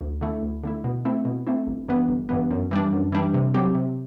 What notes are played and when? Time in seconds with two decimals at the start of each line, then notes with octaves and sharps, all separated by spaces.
0.01 D2
0.21 D3 A3 E4
0.43 D2
0.64 D3 A3 E4
0.84 B2
1.05 A3 C4 E4
1.25 B2
1.47 A3 C4 E4
1.67 G1
1.88 G2 E3 B3
2.08 G1
2.29 G2 E3 B3
2.51 F#2
2.71 E3 G3 D4
2.93 F#2
3.12 E3 G3 D4
3.34 C3
3.54 F#3 C4 G4
3.75 C3